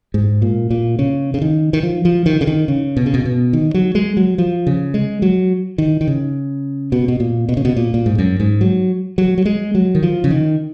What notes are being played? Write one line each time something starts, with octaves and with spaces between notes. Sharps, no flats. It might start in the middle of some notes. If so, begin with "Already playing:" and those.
G#2
A#2
A#2
C#3
C#3
D#3
D#3
F3
F3
D#3
C#3
D#3
C#3
B2
C#3
B2
B2
D#3
F#3
G#3
F#3
F3
C#3
G#3
F#3
D#3
D#3
C#3
B2
B2
A#2
B2
C#3
B2
A#2
A#2
G#2
F#2
G#2
F#3
F#3
F#3
G#3
F#3
D#3
F3
C#3
D#3